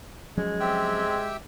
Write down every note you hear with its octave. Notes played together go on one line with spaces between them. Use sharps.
F3 F#3 G#3 C#4
C4 G4 E5 G5